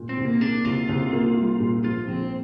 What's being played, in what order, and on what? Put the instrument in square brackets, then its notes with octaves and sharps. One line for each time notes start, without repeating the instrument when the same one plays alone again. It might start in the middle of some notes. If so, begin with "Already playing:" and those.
Already playing: [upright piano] A#2
[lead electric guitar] C4
[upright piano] C2
[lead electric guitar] A#3
[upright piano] A#3 [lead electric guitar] D4
[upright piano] C2 [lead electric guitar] F4
[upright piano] C2
A#3
G3
A#2
[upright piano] F3 [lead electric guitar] F4
[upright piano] A#1 [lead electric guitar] C4